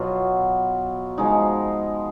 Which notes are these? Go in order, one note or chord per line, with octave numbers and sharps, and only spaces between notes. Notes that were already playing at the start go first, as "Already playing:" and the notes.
Already playing: B2 F#3 B3 F4
F3 G#3 D#4